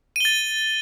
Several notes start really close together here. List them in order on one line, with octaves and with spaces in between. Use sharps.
D#7 G7 A6